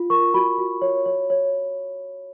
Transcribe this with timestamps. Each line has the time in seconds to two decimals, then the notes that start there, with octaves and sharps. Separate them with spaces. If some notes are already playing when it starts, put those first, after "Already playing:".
Already playing: F4
0.10 A#4 C#6
0.34 F#4 B5
0.58 F#4
0.82 C#5
1.06 C#5
1.30 C#5